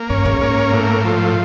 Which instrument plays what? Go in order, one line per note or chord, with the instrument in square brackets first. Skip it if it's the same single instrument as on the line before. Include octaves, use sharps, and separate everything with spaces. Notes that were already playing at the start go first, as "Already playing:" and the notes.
Already playing: [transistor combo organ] A#3
[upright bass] G2 [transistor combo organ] C#4
[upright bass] G#2
[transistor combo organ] A#3
A2
F3